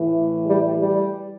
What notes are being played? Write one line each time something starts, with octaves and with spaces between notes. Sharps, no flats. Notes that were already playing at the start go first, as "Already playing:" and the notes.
Already playing: A2 E3
G3
G3